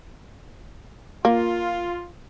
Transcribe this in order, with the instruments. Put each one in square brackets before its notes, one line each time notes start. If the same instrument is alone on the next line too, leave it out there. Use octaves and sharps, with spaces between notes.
[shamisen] A#3 [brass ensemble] F4